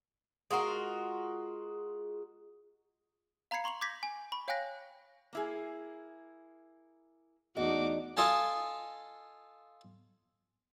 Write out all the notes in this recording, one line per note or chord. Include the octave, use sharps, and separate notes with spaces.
G#3 F4 F#4 A#4
F5 A#5 B5 G#6 C7 C#7
A#5 C6 C#6 F7 F#7
D6 G6 G#6 A#6 B6
G#5
B5 C#6
C#5 F5 G5 G#5 F#6 A#6
A#3 E4 G#4
E2 A3 D4 D#4 F#4 D#5 D6
F4 A4 D#5 G#5 A5